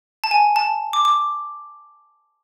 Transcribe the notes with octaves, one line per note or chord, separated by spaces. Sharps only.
A5
G#5
A5
D6
D6